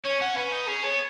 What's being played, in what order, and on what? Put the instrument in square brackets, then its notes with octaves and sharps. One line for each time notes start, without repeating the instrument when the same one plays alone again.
[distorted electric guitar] C#4 [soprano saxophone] C#5
[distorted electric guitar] C#4 [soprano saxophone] F#5
[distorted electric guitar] C#4 [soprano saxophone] B4
[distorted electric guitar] D#4
[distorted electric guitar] C#4 [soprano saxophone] G#4
[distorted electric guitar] B3 [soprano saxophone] C#5